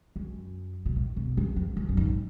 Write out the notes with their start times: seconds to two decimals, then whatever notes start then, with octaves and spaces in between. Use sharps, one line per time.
0.16 F#2
0.86 B2
0.96 A2
1.16 B2
1.37 F#2
1.56 F2
1.77 F#2
1.89 F#2
1.97 G#2